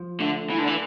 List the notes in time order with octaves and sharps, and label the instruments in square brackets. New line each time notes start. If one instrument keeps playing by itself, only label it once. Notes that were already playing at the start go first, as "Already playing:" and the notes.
Already playing: [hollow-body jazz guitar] F3
[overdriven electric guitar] D3 [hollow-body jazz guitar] A3
[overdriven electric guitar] E3
D3
[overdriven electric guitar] E3 [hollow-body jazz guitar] D4